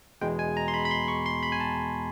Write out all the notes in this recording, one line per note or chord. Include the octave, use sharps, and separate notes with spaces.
E2 B2 G#3 G5
G#5
A#5
C6
B5
B5
C6
C#6
C6
B5
G#5
A5